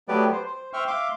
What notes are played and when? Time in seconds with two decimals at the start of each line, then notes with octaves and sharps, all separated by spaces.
0.08 F#3 A3 B3 G4 B4 D5
0.32 C5
0.47 C5
0.73 C5 E5 G5 C#6 F6
0.87 E5 F5 C6 D6